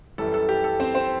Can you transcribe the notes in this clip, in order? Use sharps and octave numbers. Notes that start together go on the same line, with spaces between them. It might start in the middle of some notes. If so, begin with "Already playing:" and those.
F#2 E3 G3 A4
A4
G4
A4
C4 C5
C4 C5